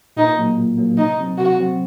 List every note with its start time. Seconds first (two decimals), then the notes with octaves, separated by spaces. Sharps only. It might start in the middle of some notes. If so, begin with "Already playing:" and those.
0.17 A#2 D#4
0.38 F#3 A#3
0.58 A#2
0.78 F#3 A#3
0.98 C3 D#4
1.18 F#3 C4
1.38 C3 F#4
1.59 F#3 C4